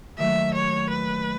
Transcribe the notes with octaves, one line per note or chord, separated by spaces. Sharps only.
D#2 D#3 F#3 A3 E5
C#5
B4